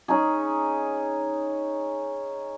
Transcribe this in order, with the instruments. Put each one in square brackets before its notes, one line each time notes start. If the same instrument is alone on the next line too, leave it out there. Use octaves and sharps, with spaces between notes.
[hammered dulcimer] C#4 D#4 G#4